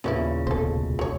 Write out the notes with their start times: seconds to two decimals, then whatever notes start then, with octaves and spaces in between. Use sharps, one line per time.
0.04 D#2 A#2 C#3 F#3 B3 E4
0.47 F1 C#2 B2 A4 C5
0.99 F#3 C#5